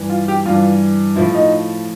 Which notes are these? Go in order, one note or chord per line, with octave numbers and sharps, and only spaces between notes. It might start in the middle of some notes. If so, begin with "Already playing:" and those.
Already playing: G2 E3
F4
G4
G2 E3 F4
A2 F3 E4
D#4